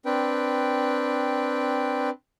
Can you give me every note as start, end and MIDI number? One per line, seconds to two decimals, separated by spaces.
0.06 2.10 60
0.06 2.10 62
0.06 2.10 71
0.06 2.10 79